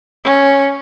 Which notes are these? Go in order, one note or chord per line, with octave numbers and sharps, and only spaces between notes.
C#4